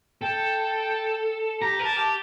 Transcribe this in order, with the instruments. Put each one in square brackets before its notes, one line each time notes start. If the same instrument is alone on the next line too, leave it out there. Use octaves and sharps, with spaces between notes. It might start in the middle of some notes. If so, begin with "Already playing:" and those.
[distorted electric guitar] A4 [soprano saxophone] G5
[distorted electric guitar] G4 [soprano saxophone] A#5
[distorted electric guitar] A#4
[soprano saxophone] A5
[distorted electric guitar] G4